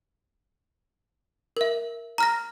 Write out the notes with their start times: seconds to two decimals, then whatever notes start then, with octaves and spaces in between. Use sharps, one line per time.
1.57 A#4 E5
2.18 A#5 F6 A#6